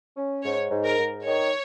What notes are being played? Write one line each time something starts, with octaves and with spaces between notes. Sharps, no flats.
C#4
G#2 C#5
G#2
A#4
G#2
D#3 C#5